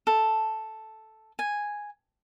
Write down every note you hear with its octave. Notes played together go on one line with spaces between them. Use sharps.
A4
G#5